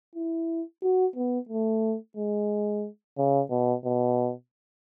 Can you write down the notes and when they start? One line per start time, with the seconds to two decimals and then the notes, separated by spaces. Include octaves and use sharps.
0.15 E4
0.82 F#4
1.15 B3
1.49 A3
2.17 G#3
3.18 C#3
3.50 B2
3.84 B2